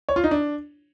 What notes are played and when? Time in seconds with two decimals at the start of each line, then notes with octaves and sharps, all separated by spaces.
0.09 C#5
0.16 F4
0.24 D#4
0.31 D4